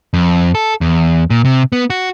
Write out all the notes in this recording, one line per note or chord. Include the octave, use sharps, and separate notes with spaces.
F2
A4
E2
A#2
C3
B3
F#4